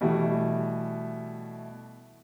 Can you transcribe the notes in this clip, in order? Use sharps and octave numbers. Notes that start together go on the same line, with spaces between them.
B2 E3 G3 A3